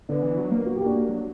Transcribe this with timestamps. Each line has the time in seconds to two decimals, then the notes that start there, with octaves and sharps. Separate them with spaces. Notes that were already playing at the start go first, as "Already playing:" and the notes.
0.09 D3 B3 D4
0.23 E3
0.38 F#3
0.51 A#3
0.66 F#4
0.76 A#3 G4
0.86 D4 F#4
0.95 A#3
1.09 F#3